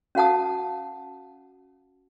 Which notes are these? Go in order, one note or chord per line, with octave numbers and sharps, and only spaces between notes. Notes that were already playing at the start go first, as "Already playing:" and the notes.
C#4 F#4 F5 F#5 A5 D#6